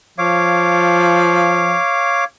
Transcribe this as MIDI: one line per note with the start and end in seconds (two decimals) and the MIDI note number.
0.18 1.77 53
0.18 2.24 73
0.18 2.24 77
0.18 2.24 86